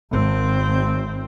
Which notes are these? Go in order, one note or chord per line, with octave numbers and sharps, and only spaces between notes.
G#1 C4